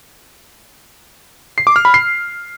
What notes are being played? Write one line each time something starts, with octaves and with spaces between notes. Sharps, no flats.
C7
D6
F6
B5
C7